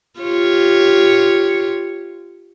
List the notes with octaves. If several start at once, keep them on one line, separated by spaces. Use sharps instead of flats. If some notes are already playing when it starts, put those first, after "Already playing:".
F4 G4 C#5